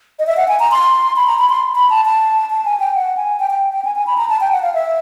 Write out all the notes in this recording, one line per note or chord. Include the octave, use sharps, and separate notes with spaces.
D#5
E5
F#5
G#5
A#5
C6
B5
A#5
B5
C6
B5
A5
A5
A5
G#5
G5
F#5
G#5
G5
G5
G5
G#5
G#5
B5
A#5
A5
G5
F#5
F5
E5